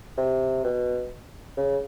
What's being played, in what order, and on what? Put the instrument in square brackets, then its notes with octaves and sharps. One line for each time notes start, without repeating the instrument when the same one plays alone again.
[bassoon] C3
B2
C#3